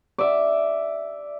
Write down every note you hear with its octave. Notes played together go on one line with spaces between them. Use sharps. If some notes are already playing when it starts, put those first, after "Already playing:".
D5 E5